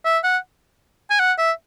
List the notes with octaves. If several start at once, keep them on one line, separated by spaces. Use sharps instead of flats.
E5
F#5
G#5
F#5
E5